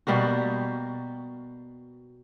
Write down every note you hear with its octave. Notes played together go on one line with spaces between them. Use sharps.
B2 G3 A#3 F#4